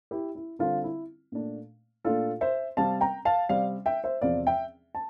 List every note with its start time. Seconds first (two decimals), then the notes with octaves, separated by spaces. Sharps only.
0.11 E4 G4
0.35 E4
0.59 D3 G3 C4 F4
0.84 E4
1.32 A#2 A3 D4
2.04 A#2 A3 D4 F4 A4
2.41 C5 E5
2.77 C3 G3 C4 F5 A5
3.01 G5 A#5
3.25 F5 A5
3.49 C3 G3 C4 D5 F5
3.86 E5 G5
4.04 C5 E5
4.22 E2 C3 F3 C4 D5 F5
4.47 E5 G5
4.95 A5